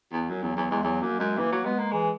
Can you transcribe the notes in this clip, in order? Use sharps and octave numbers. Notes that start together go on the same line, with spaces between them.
E2
F#2 F#3
E2 F#3
E2 F#3
E2 G#3
E2 F#3
F#2 A#3
F#2 G#3
E3 A#3
F#3
G#3 B3
A#3
E3 G#3